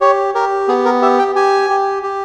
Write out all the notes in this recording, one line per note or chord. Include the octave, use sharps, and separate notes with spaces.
G4 C#5
G4 A#4
B3 G#4
A#4
G4 E5
G5
G4 G#5
G4
G4